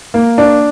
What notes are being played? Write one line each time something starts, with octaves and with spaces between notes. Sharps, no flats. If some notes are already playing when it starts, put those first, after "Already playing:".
A#3
D4